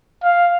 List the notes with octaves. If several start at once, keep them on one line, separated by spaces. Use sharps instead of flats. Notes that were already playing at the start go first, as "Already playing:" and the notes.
F5